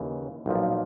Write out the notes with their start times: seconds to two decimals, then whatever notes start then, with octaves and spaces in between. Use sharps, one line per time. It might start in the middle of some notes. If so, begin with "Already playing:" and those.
Already playing: D#2 C#3 E3
0.46 B1 A#2 F3